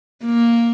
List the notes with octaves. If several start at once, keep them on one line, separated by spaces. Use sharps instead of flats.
A#3